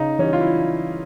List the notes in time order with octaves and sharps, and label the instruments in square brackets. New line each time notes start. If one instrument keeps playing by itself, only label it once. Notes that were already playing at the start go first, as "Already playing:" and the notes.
Already playing: [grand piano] C#3 D#4
E3 G3 C#4
F4
E4